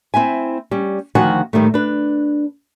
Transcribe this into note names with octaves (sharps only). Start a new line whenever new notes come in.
C4 E4 E5 G#5
G3 C#4
D2 D#3 F3 F#4 F#5 G#5
A2 D#3 G3 A3
D4 B4